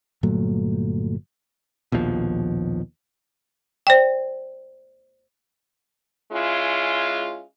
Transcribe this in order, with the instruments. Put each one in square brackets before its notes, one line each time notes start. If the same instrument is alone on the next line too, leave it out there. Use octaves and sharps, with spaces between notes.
[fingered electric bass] G1 A#2 F#3 A3
[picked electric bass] A#1 D#2 B2 F3
[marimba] C5 D5 G5
[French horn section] G#3 C#4 E4 F4